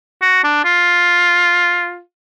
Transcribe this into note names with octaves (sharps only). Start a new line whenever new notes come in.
F#4
D4
F4